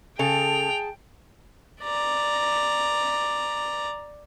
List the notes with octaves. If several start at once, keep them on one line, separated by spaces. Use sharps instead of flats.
C#3 G#4 A4 G5 A5 F7
D5 A#5